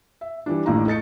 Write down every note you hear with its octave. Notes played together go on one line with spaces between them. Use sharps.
E5
E3 G3 D4
A1 A2 D#3 A#3 D4 A#5
A3 D#4 A6 C#7